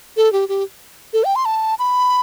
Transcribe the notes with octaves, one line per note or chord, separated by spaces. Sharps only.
A4
G4
G4
A4
G5
C6
A5
B5